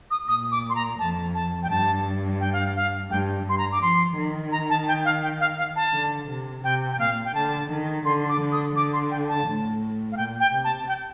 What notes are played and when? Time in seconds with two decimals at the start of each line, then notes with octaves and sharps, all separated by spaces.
0.11 D#6
0.28 A#2 D#6
0.52 D6
0.70 C6
0.75 A#5
0.99 F2 A5
1.35 A5
1.63 G5
1.70 G2 A5
2.41 G5
2.53 F5
2.76 F5
3.11 G2 G5
3.46 G2 C6
3.58 A#5
3.72 D6
3.82 F3 C6
4.17 D#3
4.52 A#5
4.70 A5
4.88 G5
5.05 F5
5.23 G5
5.40 F5
5.58 F5
5.76 A5
5.94 D3
6.29 C3
6.64 C3 G5
6.92 G5
6.99 A#2 F5
7.25 G5
7.35 D3 A5
7.71 D#3
8.05 D3 C6
8.29 D6
8.40 D3
8.52 D#6
8.76 D3 D6
8.93 C6
9.11 G5
9.29 A5
9.47 A2
10.12 F5
10.17 A#2 G5
10.40 G5
10.52 C3
10.64 A5
10.88 G5